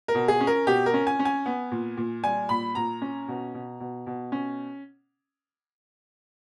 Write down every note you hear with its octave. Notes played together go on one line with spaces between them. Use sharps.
A#4
B2
G#4
C#4
A#4
B2 G4
A#4
C#4
G#5
C#4
G#5
B3
A#2
A#2
G3 G#5
A#2 B5
A#2 A#5
C#4
B2
B2
B2
B2
C#4